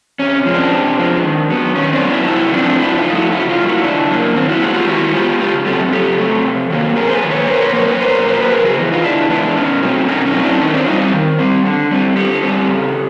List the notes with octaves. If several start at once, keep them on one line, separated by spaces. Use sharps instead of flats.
C3 C#4
F3 G#3 B3
C4 D4
C3
F3 G#3 B3
D#3
F#3 B3
D#3 C#4
C4 D4
F#3 B3
D4 E4
C#3 E4 F#4
F3 A3 C4 D4
C#3 D4 E4
F#4
D#4 F4
F3 A3
E4 F#4
C#3 E4 F#4
D#4 F4
F#3 A#3
E4 F#4
C#3 D4 E4
F#3 A#3
D#3 C4
E4 F#4
G#3 B3 F#4 G#4
F4 G4
D#3 E4 F#4
G#3 B3 F4 G4
C#3 F4 G4
F#3 A3 C4 G4 A4
C#3 G4 A4
F#3 A3 C4
C3
D#3 F#3 A#3
C3 G#4 A#4
C5
A4 B4
D#3 F#3 A#3
B4 C#5
B2 A#4 C5
B4 C#5
F#3 A#3 A#4 C5
B4 C#5
B2 A#4 C5
F#3 A#3 C5
B4
C#3 G#4 A#4
F#4 G#4
E3 G#3 B3
D#4 F4
C#3 D4 E4
E3 G#3 B3 D4 E4
B2 C#4 D#4
F#3 A3 C4
B2 C#4 D#4
C#4 D#4
F#3 A3 C4
D4 E4
D#3 C#4 D#4
C4 D4
G3 C4 D#4 F4
D#3
G3 C4
D3
G3 C4
D3 G4 A4
G3 C4
C#3